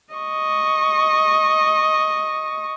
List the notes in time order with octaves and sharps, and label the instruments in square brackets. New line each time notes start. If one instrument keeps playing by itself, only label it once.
[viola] D#5 C#6